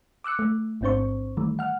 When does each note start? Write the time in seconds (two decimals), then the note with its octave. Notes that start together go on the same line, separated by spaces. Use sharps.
0.24 D6 E6 F#6 C#7
0.39 A3
0.81 A1 G#2 C4 D4 C5 C#6
1.37 D#3 E3 G3 A3
1.59 F#5 F6